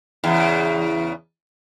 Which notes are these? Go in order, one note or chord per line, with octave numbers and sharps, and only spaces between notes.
E2 C#3